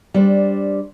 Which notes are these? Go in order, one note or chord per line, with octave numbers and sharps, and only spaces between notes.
G3 D4 C5